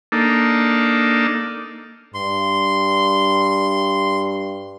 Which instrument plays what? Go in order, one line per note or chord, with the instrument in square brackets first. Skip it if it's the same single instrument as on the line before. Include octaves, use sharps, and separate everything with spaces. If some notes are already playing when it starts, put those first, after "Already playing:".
[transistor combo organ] A#3 D4 D#4 A4
[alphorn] G2 [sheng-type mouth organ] C6